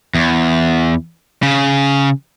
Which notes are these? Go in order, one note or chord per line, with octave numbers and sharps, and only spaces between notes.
E2
C#3